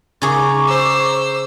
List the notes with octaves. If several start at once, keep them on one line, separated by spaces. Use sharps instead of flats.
C#3 G#4 A#5 C#6 D6
C5 E6